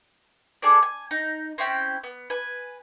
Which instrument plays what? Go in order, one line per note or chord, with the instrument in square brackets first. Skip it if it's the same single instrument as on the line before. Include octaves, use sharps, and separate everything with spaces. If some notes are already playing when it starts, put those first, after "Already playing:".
[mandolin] D4 G#4 A4 D5
G#5
D#4
C4 C#4 E4 G5
B3
B4 G#5